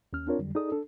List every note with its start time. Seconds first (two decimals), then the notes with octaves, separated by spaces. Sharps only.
0.13 D#2 C#4 F6
0.27 C4 D4 F4 A#4 C#5
0.39 F2 D3 F#3 G3
0.55 D#4 G#4 A4 D5 D#6
0.72 D4 A4